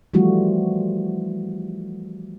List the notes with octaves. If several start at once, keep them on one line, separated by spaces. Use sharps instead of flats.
E3 F3 G3 A3 F4 F#4